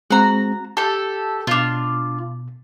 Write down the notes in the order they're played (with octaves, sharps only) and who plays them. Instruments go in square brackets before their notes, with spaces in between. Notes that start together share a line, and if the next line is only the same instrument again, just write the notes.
[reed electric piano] G#3 C4 [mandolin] F#4 A#5
[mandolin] G4 A4 [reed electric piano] A5
[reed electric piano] B2 [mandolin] D4 F4